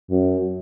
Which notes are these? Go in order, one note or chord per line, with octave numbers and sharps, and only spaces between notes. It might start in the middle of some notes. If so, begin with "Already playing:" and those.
F#2